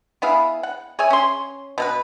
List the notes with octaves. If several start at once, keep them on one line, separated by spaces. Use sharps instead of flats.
B3 E4 G#4 F5
F#5
G#4 C#5 E5 G#5
C#4 C6
B2 E4 B4